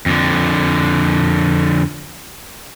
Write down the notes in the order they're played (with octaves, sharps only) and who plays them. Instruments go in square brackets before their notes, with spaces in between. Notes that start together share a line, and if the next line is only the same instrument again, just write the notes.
[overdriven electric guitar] F2 D3